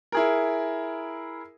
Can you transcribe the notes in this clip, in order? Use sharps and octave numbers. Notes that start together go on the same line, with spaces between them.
E4 G#4 A#4